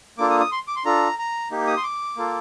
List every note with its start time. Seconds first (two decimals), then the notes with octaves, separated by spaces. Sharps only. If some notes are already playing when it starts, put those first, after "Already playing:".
0.18 A#3 D4 F4 A4 D6
0.30 D#6
0.40 D#6
0.52 C6
0.68 D6
0.76 C6
0.85 D4 F4 A4 A#5
1.18 A#5
1.51 A#3 D#4 G4
1.67 D#6
1.77 C6
1.83 D6
2.17 A#3 F4 A4